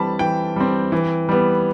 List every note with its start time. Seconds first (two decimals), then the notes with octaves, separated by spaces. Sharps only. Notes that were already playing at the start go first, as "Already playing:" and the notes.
Already playing: E3 G3 C4 A5 B5
0.19 E3 G5
0.56 G3 C4
0.92 E3
1.29 G3 B3